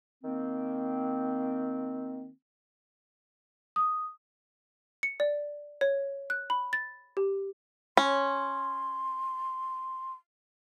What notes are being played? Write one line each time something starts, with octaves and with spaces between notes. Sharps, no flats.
D#3 A#3 C4
D#6
C#7
D5
C#5
F#6
B5
A6
G4
C#4 C6